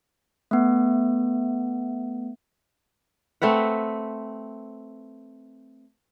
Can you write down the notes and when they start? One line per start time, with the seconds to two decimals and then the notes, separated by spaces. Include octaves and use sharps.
0.51 A3 B3
3.42 A3 C4 B4 F#5